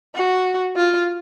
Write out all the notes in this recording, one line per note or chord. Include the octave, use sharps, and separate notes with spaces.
F#4
F4